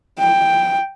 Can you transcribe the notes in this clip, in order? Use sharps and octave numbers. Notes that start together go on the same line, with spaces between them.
G5